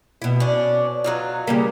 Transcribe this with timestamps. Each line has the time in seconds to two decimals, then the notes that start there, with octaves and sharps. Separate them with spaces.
0.22 B2 E4
0.40 C#4 D4
1.04 F#3 D#4 F4
1.47 C#3 G3 A#3